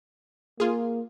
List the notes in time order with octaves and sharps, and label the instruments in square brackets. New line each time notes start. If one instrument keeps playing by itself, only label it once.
[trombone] A#3 [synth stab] F4 G#4